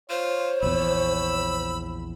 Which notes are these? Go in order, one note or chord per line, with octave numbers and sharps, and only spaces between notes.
F4 C5 C#5
A#1 E2 B5 E6